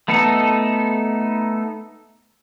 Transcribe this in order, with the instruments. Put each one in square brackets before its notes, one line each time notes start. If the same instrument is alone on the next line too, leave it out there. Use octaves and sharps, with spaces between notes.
[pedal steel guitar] A3 B3 D#4 A4